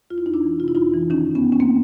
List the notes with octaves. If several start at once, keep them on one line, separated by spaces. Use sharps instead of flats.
F2 F4
E4
F2 D#4
D4 E4
E3
C3 F4
E4
F2 D#4 F4
E3
D#3 C#4 D#4
F#2
B3 C#4
D#3
C#4
A#3 C4